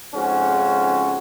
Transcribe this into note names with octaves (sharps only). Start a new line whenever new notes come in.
F2 G#2 C#3 C#4 F#4